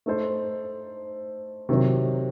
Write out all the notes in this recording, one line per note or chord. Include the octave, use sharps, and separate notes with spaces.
A3 D#4 A4 C5
C3 D#3 F#3